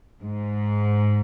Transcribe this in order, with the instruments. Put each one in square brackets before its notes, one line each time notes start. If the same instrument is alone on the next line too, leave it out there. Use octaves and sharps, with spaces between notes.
[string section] G#2